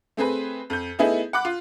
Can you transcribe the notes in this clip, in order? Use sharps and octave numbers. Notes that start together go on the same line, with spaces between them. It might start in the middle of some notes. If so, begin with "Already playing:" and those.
A3 C4 G#4 B4
F2 G6
A3 B3 D#4 E4 G#4
F#5 B5 D6 F#6
F4